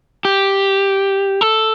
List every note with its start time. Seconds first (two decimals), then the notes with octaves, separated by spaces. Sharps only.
0.25 G4
1.41 A4